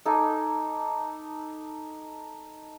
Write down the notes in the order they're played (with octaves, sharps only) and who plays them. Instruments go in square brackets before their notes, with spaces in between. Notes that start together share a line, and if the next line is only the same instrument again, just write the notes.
[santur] D#4 A4 G#5 D6